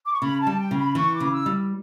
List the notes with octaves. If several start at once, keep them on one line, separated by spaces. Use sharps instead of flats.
D6
C#6
C#3 B5
A5
G3
G5
C#3
B5
E3 C#6
D6
C#3
E6
G3